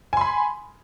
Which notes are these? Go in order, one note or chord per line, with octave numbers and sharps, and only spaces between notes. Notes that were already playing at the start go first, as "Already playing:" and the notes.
G#5 B5 C6